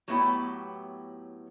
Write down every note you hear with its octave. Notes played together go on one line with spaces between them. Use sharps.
A2 F#3 B3 E4 G4